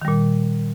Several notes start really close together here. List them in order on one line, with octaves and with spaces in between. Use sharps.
D#3 G3 A#2